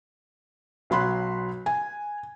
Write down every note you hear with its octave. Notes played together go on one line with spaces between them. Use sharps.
B1 F#3 B5 C6 F#6
G#5